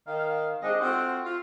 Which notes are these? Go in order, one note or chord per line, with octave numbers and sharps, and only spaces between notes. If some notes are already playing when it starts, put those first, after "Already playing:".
D#3 F5
G3 G#3 C4 D4 D#4 D#5
A3 C4 F4 F#4 C5 F#5
F4